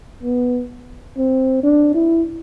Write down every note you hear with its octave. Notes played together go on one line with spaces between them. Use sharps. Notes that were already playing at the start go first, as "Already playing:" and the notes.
B3
C4
D4
E4